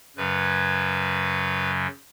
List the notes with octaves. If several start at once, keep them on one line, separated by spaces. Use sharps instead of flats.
F#2 C#3 F#3 B4